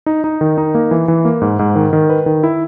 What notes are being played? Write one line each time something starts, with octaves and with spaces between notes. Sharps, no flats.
D#4
D#4
D#3
D#4
A#3
E3
E3
A#3
G#2
G#2
D#3
D#3
B4
D#3
E4